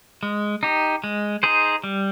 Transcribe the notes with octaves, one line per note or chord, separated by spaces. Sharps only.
G#3
D#4 G4
G#3
D#4 G#4 C5
G3